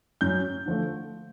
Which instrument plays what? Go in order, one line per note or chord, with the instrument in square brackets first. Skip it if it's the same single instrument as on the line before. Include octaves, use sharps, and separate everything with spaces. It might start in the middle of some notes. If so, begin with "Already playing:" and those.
[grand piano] F#2 G6
D3 F3 A3